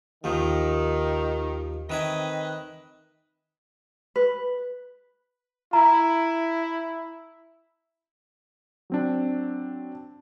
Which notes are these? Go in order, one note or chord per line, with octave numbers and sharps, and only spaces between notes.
D#2 D#3 F3
D#3 C4 B4 D#5 E5 G#5
B4
E4 A#5
F#3 C4 D4